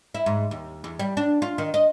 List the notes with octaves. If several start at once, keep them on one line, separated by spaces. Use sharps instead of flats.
E4
G#2
D#2
E2
G3
D4
F4
D#3
D#5